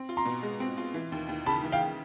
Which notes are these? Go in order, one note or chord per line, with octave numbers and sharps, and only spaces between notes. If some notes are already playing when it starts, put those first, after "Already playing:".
Already playing: C4
F4
A#5 C6
B2
G#3
C4
F4
E3
D#2
D#2
C#3 A5 B5
E3
F5 G5